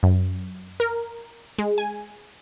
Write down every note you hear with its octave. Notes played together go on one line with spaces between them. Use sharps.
F#2
A#4
G#3
G#5